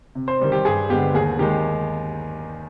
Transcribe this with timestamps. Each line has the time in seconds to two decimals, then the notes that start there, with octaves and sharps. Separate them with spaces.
0.15 C3
0.28 C5
0.40 D#3 G3 C4
0.52 G4
0.65 G2 G#4
0.89 D3 G#3 B3 G4
1.14 D#2 G#4
1.39 D#3 G#3 G4